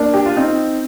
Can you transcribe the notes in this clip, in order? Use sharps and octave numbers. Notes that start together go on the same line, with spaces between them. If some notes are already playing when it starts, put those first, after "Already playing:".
Already playing: A#3 D4
G4
F4
C4 D#4